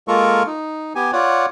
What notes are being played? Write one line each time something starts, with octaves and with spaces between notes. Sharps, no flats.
G#3 A#3 F4 A4 A#4 C#6
D#4
B3 G4 G#5
F4 C#5 D5 F#5